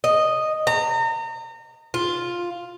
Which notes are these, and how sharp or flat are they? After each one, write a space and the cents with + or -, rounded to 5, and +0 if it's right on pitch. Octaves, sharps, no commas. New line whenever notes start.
D#5 -5
A#5 -35
F4 +5